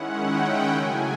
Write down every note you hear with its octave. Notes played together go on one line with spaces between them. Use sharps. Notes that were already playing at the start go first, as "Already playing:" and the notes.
Already playing: D#3 G#3 C#4 E4 F#5
G5
C#3 F#3 A3 G#5